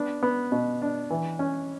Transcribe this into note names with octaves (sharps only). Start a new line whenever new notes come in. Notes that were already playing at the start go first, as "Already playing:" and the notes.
Already playing: B3 D4
B3
B2
D4
E3
C#4